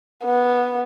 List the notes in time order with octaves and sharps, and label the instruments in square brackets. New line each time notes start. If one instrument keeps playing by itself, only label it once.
[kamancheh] B3